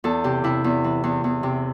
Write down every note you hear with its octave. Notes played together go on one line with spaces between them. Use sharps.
E2 A4
C3 G4
C3 E4
E2
E3
E2
E2
C3